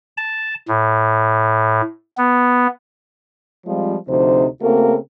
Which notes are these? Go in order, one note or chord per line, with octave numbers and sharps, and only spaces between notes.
A5
A2
B3
F3 G3 G#3 C4 F4
D2 C3 F3 D#4 C5
C#3 A3 A#3 C4 F#4 A#4